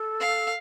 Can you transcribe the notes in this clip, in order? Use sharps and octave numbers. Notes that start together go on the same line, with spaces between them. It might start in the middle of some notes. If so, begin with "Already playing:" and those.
Already playing: A4
F5